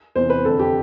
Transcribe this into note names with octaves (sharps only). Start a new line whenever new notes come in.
E2 C3 E3 C5
B4
F2 D3 A4
G4